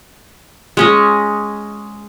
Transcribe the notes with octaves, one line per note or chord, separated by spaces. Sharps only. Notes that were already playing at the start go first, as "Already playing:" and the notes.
G#3 C#4 D#5